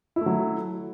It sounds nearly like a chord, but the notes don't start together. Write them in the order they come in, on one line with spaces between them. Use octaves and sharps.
E4 A3 F#3